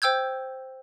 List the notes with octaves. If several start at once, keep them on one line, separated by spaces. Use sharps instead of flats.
C5 G5 E6 G6 G#6